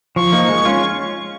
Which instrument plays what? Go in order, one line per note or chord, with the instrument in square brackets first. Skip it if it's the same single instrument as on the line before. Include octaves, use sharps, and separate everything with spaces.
[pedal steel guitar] F3 [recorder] C#6
[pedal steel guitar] A#3 D#4
G#3
C#4 F4